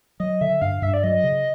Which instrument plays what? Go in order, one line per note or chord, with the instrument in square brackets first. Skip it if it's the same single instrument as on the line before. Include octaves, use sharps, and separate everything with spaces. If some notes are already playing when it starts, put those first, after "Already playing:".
[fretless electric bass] F#3 [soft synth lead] D#5
[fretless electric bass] D3 [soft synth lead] E5
[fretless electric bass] G2 [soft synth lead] F5
[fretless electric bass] G2 [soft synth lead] E5
[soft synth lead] D5
[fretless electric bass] F#3 [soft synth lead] D#5
[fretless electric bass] C#3